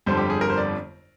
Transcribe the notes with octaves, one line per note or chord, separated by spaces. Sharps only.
G1 F2 D3 G3 C5
G4
G#4
A#4
C5
D5